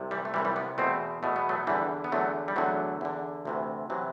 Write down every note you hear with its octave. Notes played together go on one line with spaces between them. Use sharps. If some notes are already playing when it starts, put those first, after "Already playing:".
Already playing: C2 C3
E3 G3
A3
C2 C3 E3 G3
E3 G3
G3 B3
E2 B2 A3 C4
E2 B2 A3
B3
F#3 A3
E2 D3 E3 G3
B3
E2 D3 F#3 A3
G3
E2 D3 F#3 A3
E2 D3
D2 C3 E3
C3 E3 F#3